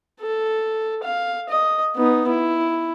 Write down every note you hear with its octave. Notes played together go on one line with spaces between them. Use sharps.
A4
F5
D#5
B3 D#4
E4